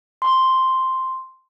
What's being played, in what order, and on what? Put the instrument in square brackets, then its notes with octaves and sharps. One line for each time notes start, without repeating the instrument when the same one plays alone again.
[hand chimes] C6